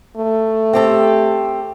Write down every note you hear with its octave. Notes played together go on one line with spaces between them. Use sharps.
A3
C4 G4 A4